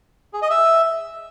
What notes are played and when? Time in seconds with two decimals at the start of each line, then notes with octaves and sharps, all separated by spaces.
0.33 G#4
0.42 D#5
0.50 E5